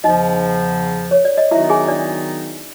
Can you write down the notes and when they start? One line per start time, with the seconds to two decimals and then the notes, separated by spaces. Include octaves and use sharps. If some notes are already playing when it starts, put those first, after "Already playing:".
0.04 E2 C#3 F3 D#4 D#5
1.11 C#5
1.25 D5
1.37 D#5
1.51 D#3 F#3 B3 D#4 E4 F#4 E5
1.70 G#4 G#5
1.88 D4 D5